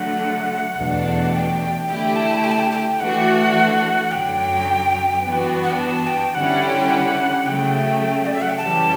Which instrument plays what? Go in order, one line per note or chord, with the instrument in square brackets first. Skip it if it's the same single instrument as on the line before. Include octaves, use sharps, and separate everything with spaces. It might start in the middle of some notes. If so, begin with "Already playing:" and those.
Already playing: [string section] D3 F#3 A3 [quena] F#5
[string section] E2 B2 F#3 A3 D4
[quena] G5
[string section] D3 A3 E4 G4 [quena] G5
[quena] A5
G5
A5
G5
G5
[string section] E3 A3 D4 F#4 [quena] F#5
[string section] F#2 D3 F#3 [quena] G5
[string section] G2 E3 B3 D4 F#4
[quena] F#5
G5
A5
G5
[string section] D3 G3 C#4 E4 [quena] F#5
[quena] G5
F#5
[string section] C#3 F#3 A3 [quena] G5
[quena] D5
E5
F#5
G5
[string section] F#2 E3 G3 C#4 G4 [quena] A5